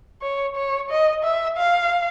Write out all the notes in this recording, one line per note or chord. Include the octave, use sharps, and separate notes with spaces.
C#5
C#5
D#5
E5
F5